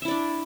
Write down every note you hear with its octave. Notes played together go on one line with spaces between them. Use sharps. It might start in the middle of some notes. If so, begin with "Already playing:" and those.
D4 E4 D5 E5